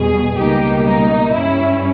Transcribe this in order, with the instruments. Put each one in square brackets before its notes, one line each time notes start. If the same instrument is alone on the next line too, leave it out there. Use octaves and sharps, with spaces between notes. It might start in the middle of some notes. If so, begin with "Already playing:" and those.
Already playing: [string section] E2 B2 G3 G#4
C#2 B2 G3 A#3 D#4 G4
D#4
G2 G3 C#4 E4